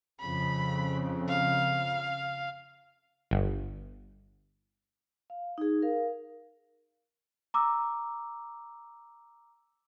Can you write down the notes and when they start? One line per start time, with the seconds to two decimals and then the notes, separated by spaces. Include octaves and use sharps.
0.20 F2 C#3 B5
1.28 F5
3.31 G1
5.30 F5
5.58 D#4 G#4
5.82 A#4 F5
7.54 A#5 D6 E6